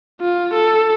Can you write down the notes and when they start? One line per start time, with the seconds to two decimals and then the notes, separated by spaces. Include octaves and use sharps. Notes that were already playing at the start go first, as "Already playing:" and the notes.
0.21 F4
0.53 A4